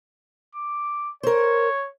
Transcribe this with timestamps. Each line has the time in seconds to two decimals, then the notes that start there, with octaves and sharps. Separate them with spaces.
0.55 D6
1.23 A#4 C5 C#5